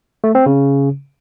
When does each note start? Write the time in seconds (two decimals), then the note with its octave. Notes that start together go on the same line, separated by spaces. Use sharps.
0.24 A3
0.35 C4
0.46 C#3